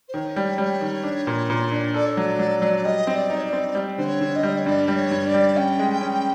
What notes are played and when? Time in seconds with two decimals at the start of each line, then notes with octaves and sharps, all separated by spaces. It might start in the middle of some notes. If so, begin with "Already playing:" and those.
0.08 C5
0.13 D#3 C#5
0.36 G3
0.58 G3
0.81 D#3
1.03 D4
1.27 A#2
1.50 A#2
1.72 D4
1.94 A4 D5
2.06 C#5
2.17 F#3 D5
2.39 F#3
2.62 F#3
2.84 G3 D#5
3.07 C4
3.15 D5
3.30 D#4
3.36 C#5
3.45 D5
3.53 C4
3.75 G3
3.97 D3 C5
4.06 C#5
4.21 D3
4.35 D#5
4.43 G3
4.57 C#5
4.66 G2 D5
4.88 G3
4.96 C#5
5.11 G2
5.26 D5
5.34 G3
5.56 C#4 G5
5.79 G#3
6.01 C#4